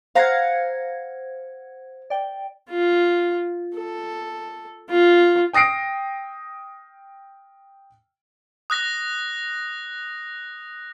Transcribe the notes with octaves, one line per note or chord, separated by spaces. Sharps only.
C5 F5 F#5 A#5 G#6
D5 G5
F4
A4
F4
G5 D#6 A#6 C7 D7
D#6 F#6 A#6